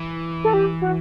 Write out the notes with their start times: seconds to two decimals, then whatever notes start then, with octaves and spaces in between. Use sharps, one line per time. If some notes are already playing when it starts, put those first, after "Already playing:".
Already playing: E3
0.45 A4
0.54 G4
0.82 F#4